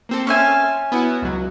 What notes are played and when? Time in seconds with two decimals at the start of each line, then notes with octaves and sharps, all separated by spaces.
0.09 A#3 C4 A4
0.27 C#4 E5 G#5 A5 C6 F6
0.92 B3 E4 F#4
1.22 C#2 F#3